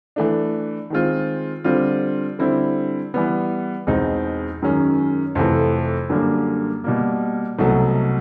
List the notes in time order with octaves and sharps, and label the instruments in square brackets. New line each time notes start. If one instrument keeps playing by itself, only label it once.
[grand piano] E3 A3 D4
D#3 G#3 C4 F4
D3 G3 C4 F4
D3 G3 C4 E4
E3 G3 B3
E2 B2 G#3 C4 D#4
F#2 D#3 G#3 C#4
F2 C3 E3 A3
F#2 D3 G3 A#3
B2 G3 A#3
C2 B2 F#3 A3